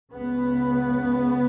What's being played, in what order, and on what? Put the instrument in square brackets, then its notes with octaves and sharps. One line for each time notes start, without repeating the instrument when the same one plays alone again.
[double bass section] C#2 C#3 B3